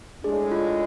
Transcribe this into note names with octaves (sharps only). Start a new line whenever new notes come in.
A2 G#3 D4 G#4
F4